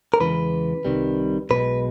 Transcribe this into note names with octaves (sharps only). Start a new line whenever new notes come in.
A#4
E2 C#3 E3 G#3 B4
C2 C3 D#3 G3
B1 B2 G#3 B4